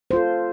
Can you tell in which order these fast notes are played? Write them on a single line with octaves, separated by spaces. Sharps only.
C5 F4 A4